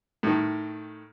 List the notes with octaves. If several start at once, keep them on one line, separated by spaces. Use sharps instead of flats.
A2 D#3